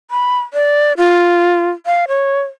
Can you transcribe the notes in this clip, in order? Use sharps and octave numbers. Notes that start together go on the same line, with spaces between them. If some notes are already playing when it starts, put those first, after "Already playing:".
B5
D5
F4
F5
C#5